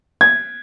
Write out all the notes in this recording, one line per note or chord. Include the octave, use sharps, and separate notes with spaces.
G#6